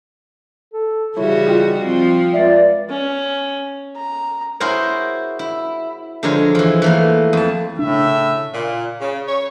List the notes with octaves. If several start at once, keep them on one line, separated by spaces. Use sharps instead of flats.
A4
C#3 E3 G3 E4 F#4 C#5
D#4 F4 G5
F3 C4
C#2 C#5 D5 E5 F5
C#4
A#5
E4 F#4 G#4 A#4 C5 C#5
E4
D3 F3 G#3 A#4 C#5
E3 F3
E3 A3 A#3
F2 A5
A2 C#3 D4 E5
A#2
C#3
C#5